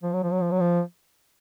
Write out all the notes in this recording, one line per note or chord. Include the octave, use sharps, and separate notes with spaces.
F3
F#3
F3
F#3
F3
F#3
F3